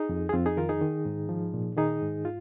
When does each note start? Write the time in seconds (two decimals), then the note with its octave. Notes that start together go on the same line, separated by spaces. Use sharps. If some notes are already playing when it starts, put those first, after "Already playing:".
Already playing: D#4 G#4
0.09 F2
0.29 G#4
0.33 F2 C4 F4
0.46 D#4 G#4
0.57 D#3 F4 A#4
0.69 D#4 G#4
0.82 D#3
1.06 G#2
1.29 F3
1.54 A#2
1.77 D#3 D#4 G#4
2.02 G#2
2.25 F4